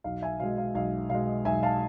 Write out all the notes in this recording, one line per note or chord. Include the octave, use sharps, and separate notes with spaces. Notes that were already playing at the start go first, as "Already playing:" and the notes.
B1 F5
E5 G#5
B2 G#3 F5
F5
B1 F5
B2 G#3 F5
B1 E5 G#5
F5 A5